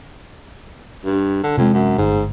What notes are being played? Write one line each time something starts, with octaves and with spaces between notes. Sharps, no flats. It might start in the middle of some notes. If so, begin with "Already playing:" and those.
G2
D3
F2 C3 G#3
F#2
G1 G#2